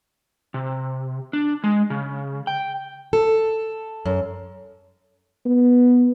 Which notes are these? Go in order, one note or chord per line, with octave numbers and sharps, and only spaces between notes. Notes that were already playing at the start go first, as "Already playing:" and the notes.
C3
D4
G#3
C#3
G5
A4
F#2
B3